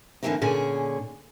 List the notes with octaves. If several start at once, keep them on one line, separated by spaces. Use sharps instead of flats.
D3 E3 A3 A#3 C4 D#4
A#2 D3 C#4 G#4